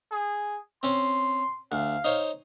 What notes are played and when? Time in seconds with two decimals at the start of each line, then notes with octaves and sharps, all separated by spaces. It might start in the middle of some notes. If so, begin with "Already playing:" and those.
0.11 G#4
0.83 C4 C#4 C6
1.72 D2 F5
2.04 D#4 C5 C#5